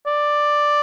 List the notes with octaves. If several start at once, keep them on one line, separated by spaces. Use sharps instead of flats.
D5